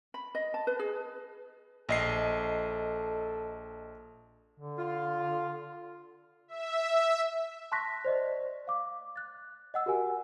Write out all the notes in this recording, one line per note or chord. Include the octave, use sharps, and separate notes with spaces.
B5
D#5
A5
B4
G#4
A#1 A4 D#5 C7
D3
F4
E5
A5 C6 C#6 F#6 A#6 B6
C5 D5 D#5
F5 D6
F#6 A6
D#5 F#5 E6
F#4 G4 A#4 F#5 G#5